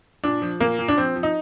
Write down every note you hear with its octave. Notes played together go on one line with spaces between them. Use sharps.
A#2 D4
F3
A#2 A#3
A#2
D4
F3 C4
F3
D#4